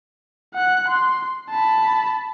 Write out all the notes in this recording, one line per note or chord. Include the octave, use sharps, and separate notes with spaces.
F#5 F#6
C6
A5 B5